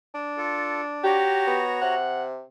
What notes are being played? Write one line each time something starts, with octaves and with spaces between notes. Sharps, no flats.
D4
F4 A4
F#4 G4 C#5 A#5
B3
C3 F#5